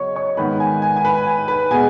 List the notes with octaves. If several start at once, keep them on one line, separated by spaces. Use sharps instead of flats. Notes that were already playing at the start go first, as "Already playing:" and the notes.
Already playing: C#3 F#3 B3 C#5 D#5 C#6
C#5 C#6
G#2 D#3 B3 B4 B5
G#5
G#5
G#5
B4 B5
G#5
B4 B5
B2 G#3 B3 G#5